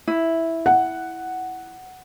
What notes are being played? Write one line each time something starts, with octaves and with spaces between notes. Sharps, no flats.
E4
F#5